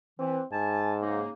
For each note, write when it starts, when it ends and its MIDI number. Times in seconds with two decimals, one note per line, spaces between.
0.19 0.39 52
0.19 0.45 60
0.52 1.22 44
0.52 0.93 80
0.52 0.93 81
1.02 1.30 49
1.02 1.30 58
1.02 1.30 63